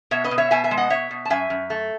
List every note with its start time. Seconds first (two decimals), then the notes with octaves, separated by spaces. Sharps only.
0.11 B2 C#5 E5
0.24 B4 D#5
0.31 B2
0.38 C#5 E5
0.51 B2 E5 G#5
0.64 E5 G#5
0.71 G#3
0.77 D#5 F#5
0.90 B2 C#5 E5
1.11 B2
1.25 A5
1.30 F#2 E5 G#5
1.50 F#2
1.70 A3